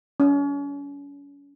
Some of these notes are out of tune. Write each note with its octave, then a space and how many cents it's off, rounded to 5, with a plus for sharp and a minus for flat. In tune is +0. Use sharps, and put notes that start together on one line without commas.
C#4 +35